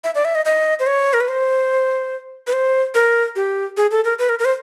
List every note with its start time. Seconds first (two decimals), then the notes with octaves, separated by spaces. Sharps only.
0.04 E5
0.15 D5
0.25 E5
0.35 D#5
0.45 D#5
0.80 C5
0.87 C#5
1.13 A#4
1.21 B4
1.28 C5
2.47 B4
2.53 C5
2.95 A#4
3.36 G4
3.77 G#4
3.91 A4
4.05 A#4
4.19 B4
4.29 A#4
4.39 A#4
4.45 C5